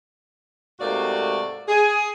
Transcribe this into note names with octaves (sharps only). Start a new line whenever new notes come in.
G#2 C3 A3 A#3 F#4 D5
G#4